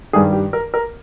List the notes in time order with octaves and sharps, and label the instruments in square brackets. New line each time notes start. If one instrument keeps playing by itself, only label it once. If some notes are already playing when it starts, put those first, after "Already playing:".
[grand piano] G2 D#3 G#4
G4
A#4
A#4